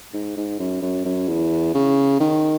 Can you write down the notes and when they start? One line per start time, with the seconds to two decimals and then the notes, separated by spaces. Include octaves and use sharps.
0.14 G#2
0.36 G#2
0.59 F#2
0.82 F#2
1.05 F#2
1.28 E2
1.75 C#3
2.21 D#3